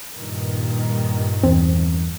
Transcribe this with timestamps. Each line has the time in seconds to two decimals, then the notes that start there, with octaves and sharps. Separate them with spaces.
0.12 G2 A#2 D#3
1.43 E2 C4